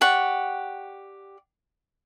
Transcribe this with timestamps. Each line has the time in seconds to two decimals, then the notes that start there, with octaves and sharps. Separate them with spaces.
0.01 G4 D5 F#5 C#6